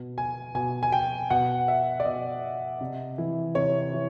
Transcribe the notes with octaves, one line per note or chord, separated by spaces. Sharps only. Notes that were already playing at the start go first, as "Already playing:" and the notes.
Already playing: B2
G#5
B2 G#5
G#5
G5
B2 F#5
E5
D5
B2 D#5
C3
E3
C3 C#5
E3